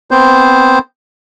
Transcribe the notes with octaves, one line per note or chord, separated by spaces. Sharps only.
B3 C4 C5